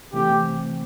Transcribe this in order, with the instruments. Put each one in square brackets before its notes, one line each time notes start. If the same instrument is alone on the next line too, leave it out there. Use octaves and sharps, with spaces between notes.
[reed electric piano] C3 E3 A3 C4 [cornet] G4